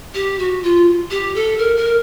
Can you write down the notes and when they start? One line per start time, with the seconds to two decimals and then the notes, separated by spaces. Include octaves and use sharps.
0.14 G4
0.39 F#4
0.63 F4
1.10 G4
1.35 A4
1.58 A#4
1.76 A#4